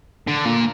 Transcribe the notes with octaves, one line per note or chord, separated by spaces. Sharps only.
D3
A#2